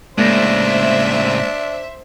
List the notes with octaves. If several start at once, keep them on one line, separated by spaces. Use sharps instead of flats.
A2 C#3 G#3 A#3 D4 C5 E5 A#6